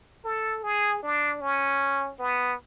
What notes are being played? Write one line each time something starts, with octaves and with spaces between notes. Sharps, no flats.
A4
G#4
D4
C#4
B3